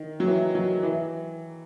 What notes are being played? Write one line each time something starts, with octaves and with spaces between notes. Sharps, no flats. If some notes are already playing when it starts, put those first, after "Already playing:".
Already playing: D#3
F#3
E3
F#3
E3